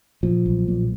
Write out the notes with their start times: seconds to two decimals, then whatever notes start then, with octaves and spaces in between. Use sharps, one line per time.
0.23 A#2 F3
0.46 B1
0.68 A#2